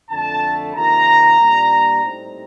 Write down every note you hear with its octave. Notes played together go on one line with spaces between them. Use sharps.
F2 D3 A3 A5
C3 D#3 A#3 F4 A#5
A#2 G3 D4
A2 G3 C4 D#4